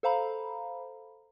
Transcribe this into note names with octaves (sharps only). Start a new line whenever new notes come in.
A4 C5 F5 A#5 B5